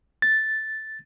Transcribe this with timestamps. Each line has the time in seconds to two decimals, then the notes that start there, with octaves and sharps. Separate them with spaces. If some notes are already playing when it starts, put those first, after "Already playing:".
0.22 A6